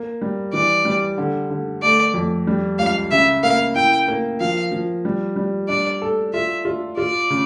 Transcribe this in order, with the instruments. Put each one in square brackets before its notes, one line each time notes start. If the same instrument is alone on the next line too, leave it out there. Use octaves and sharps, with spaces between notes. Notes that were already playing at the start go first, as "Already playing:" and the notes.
Already playing: [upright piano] A#3
G3
[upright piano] E3 [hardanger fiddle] D5
[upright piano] G3
D3
D3
[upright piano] A3 [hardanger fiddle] D5
[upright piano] F2
G3
[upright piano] C#2 [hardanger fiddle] F5
[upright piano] C#3 [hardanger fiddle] E5
[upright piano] A#3 [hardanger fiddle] F5
[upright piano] E4 [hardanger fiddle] G5
[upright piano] A#3
[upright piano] F3 [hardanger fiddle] F5
[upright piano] F3
G3
G3
[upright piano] D4 [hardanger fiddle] D5
[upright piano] A4
[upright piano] F4 [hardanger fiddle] E5
[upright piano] F4
[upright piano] F4 [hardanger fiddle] D5
[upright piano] C#3